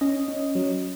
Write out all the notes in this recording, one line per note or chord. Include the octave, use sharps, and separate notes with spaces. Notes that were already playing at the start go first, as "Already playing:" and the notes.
C#4 D#5
C#4
F#3